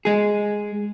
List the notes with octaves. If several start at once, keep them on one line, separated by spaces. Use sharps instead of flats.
G#3 G#4